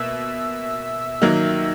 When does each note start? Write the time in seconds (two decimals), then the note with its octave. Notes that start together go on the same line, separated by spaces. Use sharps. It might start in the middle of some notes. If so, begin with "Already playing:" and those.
Already playing: B2 A#3 E5 E6
1.22 D#3 F#3 A#3